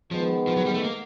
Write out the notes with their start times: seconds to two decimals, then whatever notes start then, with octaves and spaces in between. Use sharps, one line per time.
0.11 D#3 F3 G#3 B3
0.47 F3
0.57 F#3
0.66 G3
0.74 A3
0.84 A#3